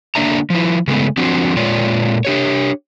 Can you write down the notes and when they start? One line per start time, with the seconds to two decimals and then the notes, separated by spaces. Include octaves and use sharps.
0.15 D3 A#3 D4 D5 E5 A#5
0.50 F3 E4
0.87 C#3 G#3 A3 B3
1.17 F3 C4 D4 F#4
1.57 A#2 G#3 F4 C#5 D5
2.25 D4 G4 C#5